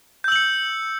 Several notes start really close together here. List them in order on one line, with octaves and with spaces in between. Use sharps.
G6 E6 F#7 C#7